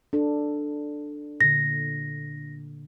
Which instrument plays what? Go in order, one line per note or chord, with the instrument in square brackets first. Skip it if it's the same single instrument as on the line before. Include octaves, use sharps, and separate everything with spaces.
[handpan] D4 A4
[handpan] A#2 D3 [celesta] A#6